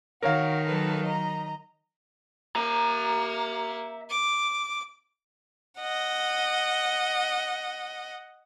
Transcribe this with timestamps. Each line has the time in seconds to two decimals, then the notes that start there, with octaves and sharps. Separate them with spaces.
0.22 D#3 F#4 A#4 C#5 F5
0.65 F#3 A4 B4
1.05 D#5 A#5
2.56 A#3 E5 A#5
4.09 D6
5.79 D#5 F#5